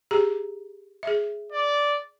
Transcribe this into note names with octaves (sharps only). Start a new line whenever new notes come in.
G4 G#4 A#5
G#4 E5
D5